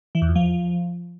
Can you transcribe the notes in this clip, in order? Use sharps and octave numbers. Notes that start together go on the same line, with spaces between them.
E3
E2
F2
F3